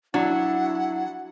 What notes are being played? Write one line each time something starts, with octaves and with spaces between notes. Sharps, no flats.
F#3 D4 E4 F#5